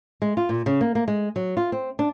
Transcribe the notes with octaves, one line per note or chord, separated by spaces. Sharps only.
G#3
F4
A#2
C#3
A#3
A#3
G#3
F#3
F4
C4
D4